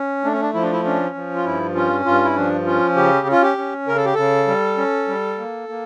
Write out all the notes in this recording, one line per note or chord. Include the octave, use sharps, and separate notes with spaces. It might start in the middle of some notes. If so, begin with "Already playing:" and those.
Already playing: C#4
A3 D4
C#4
D4
F3 E4
D4
E4
C#4 D4
F3
F4
G2 E4
C#4 F4
G2 F4
E4
F3 D4
C#4 F4
C#3 G4
C#4
F4
G4
C#4
C#3 A#4
A4
G4
C#3 A4
G3
C#4
G3
A#3
A#3